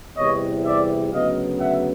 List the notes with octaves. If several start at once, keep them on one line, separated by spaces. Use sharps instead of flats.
E2 C3 E3 G3 C#5 D#5
D5 E5
D2 C#3 F#3 B3 D#5 F5
E5 F#5